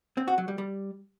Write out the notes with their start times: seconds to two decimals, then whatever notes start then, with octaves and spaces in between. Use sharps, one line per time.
0.17 C4
0.28 F#4
0.38 F#3
0.48 G3
0.58 G3